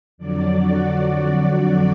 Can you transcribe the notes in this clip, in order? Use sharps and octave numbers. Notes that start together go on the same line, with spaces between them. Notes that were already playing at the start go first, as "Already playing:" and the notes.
F2 D3 F#3 D5
F#4